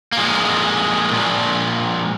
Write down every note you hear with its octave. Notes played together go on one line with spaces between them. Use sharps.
A#3
A#2 F3 G#3
A#2 F3